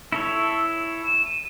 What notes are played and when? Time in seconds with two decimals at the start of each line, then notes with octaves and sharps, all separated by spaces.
0.12 E4 A4 C#5 E6
1.05 E7
1.25 D#7